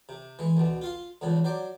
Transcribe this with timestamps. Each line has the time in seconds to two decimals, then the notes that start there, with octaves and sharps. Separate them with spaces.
0.09 C3
0.39 E3 G#3
0.57 D2 B2
0.81 F4 F5 C6
1.21 E2 G#2 C#3 F3
1.44 F#3 C5 D5